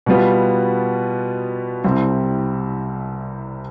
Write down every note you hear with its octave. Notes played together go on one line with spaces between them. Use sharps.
B2 G3 B3 F4
C2 C3 G3 C4 E4